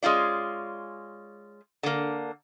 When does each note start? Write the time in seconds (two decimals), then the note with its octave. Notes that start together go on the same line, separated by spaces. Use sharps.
0.03 G#3 C#4 F4 D5
1.83 D3 A#3